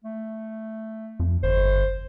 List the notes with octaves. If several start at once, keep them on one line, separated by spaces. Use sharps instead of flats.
A3
F2
G1 C5